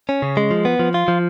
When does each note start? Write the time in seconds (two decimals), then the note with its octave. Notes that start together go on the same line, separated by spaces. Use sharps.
0.09 C#4
0.22 C#3
0.37 G#3
0.51 F3
0.65 B3
0.79 F3
0.94 F4
1.08 F3